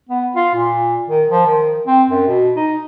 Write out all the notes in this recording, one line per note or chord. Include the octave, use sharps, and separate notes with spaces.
B3
F4
A#2
D#3
F3
D#3
C4
F#2
B2
D#4